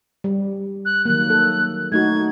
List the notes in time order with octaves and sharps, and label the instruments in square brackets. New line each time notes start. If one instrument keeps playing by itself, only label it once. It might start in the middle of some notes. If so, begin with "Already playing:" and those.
[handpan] G3
[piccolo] F#6
[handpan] D#3 F#3 A#3 [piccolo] F#6
[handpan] A4
[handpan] A3 D#4 F#4 [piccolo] G#6